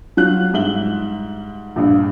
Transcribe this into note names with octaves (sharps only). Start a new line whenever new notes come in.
F#3 F4 F#6 F#7
G#2 G3 E5 F#7 G7
A#1 G2